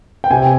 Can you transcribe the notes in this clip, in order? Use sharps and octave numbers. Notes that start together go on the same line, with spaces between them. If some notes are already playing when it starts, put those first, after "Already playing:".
G5
C3 G#5